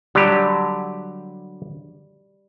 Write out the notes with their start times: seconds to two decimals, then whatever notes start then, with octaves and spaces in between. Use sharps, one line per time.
0.15 D3 F#3 G3 G4